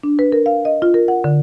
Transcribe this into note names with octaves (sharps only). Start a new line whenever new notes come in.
D4
B4
A#4
F5
D#5
F4
A#4
F#5
D3